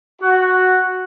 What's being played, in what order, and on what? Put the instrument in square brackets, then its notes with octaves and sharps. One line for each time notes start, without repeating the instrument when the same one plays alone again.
[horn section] F#4